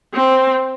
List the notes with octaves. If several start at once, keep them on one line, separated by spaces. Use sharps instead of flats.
C4